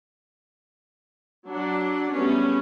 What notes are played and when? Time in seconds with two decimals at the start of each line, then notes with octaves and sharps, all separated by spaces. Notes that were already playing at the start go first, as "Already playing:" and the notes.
1.50 F#3 D4 F#5
2.15 G3 A3 B3 C#4 G#4